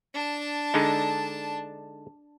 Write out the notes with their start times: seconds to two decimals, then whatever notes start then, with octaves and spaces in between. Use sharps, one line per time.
0.14 D4 A5
0.74 D3 G#3 D#4